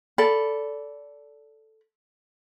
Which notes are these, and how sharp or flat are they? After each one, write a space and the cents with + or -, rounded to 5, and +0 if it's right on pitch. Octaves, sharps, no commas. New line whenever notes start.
A4 +0 D5 -20 B5 +0